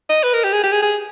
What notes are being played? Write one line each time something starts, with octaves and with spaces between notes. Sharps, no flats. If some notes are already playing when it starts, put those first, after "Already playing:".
D#5
B4
A#4
G4
G#4
G4
G#4
G#4